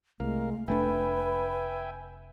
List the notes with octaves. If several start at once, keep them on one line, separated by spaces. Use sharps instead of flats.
C2 G#3 A3 A#4 F5
F1 A3 D4 B4 E5 G5 G#5 B5